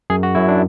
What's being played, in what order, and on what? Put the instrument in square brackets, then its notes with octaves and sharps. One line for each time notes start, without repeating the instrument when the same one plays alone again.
[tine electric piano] F#2 G#4
F#4
F#2 E4
D4